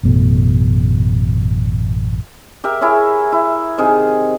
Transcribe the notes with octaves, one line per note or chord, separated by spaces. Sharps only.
A1 F#2 B2 A3
G4 A#4 E5
E4 G#4 A#4 C#5
E4
C3 D#3 G#4